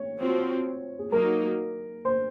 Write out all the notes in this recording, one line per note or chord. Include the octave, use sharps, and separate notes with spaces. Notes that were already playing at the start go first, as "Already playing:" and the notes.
Already playing: C#5
F3 C4 F#4
G#4
F#3 A#3 D#4 A#4
C5